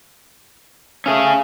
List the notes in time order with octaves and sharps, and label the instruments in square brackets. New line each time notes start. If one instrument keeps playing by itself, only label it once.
[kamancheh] A3 F5 [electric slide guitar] C#4 G#4